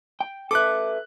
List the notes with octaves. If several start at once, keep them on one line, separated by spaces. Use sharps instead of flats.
G5
A4 B4 E5 D6 F#6